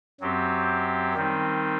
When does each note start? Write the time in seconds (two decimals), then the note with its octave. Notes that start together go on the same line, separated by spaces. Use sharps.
0.21 F#2 F#3 C4 G4
1.14 D#3 G3 C4 D#4